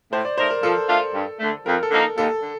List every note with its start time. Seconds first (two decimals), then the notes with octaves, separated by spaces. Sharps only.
0.12 A2 C5
0.25 D5
0.38 A3 D#4 A#4 C5
0.50 A#4
0.63 F3 A4
0.89 A3 D4 F4
1.14 G2
1.40 D3 A3
1.66 F2 A#4
1.83 A4
1.91 D3 F3 A#3 D#4
2.17 D#2 A4
2.42 D3